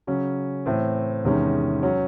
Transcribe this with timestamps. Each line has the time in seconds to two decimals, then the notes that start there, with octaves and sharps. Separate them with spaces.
0.07 C#3 F#3 C#4
0.66 A2 E3 C4
1.24 E2 C3 D#3 G#3 C#4
1.83 F#3 C#4